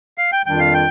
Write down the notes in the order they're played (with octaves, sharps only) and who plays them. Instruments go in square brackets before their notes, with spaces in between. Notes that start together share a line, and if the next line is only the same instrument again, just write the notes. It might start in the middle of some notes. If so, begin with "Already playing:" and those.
[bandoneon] F5
G5
[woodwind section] F2 D#3 G3 D4 F4 [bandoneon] G5
[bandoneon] F5
G5